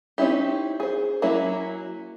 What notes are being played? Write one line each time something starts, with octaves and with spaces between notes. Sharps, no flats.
C4 C#4 D#4 E4 G4
G#4 C5
F#3 A#3 C#4 E4